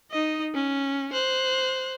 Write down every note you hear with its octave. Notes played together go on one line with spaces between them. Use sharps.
D#4 D#5
C#4
C5 F#6